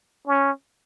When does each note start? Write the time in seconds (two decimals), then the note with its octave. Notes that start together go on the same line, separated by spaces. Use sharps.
0.27 C#4